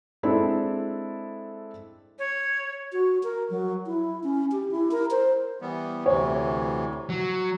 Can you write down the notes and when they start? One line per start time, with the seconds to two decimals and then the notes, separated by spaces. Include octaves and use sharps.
0.23 G#3 C4 D4 E4 A4
2.19 C#5
2.92 F#4
3.23 A#4
3.50 F#3
3.86 E4
4.24 C#4
4.52 G4
4.71 E4
4.91 A#4
5.11 C5
5.62 E3 G3 B3
6.06 D2 C3 E3 C#5
7.10 F#3